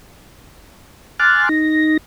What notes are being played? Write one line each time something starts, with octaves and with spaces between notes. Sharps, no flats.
G#5 C6 D6 F6 F#6 A6
D#4 A#6